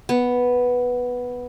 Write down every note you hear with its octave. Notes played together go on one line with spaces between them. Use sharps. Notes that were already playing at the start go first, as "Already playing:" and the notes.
B3